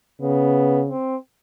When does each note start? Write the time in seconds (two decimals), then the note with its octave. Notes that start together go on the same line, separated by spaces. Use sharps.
0.22 C#3 B3
0.88 C4